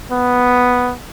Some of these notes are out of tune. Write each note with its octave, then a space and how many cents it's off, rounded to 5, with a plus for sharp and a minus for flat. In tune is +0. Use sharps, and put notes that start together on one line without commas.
B3 +0